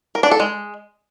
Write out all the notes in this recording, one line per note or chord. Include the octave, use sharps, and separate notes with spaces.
A#4
D4
A4
G#3